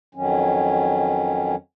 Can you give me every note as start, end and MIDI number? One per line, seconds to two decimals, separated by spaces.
0.15 1.55 41
0.15 1.55 51
0.15 1.55 54
0.15 1.55 61